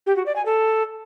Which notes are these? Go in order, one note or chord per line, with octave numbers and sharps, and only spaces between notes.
G4
F#4
D5
G#5
A4